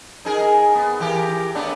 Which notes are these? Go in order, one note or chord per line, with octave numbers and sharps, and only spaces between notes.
D#4 G#4 A#4
B3
E3 G4 A#4
A2 B3 D4